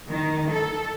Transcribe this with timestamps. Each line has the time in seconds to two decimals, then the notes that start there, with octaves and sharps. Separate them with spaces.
0.10 D#3
0.50 A4